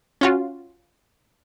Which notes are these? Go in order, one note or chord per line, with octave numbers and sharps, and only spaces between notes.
C#4 F4 F#4